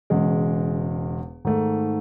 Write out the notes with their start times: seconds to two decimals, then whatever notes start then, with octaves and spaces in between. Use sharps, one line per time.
0.10 E1 E2 C#3 G#3
1.45 G#2 D#3 A3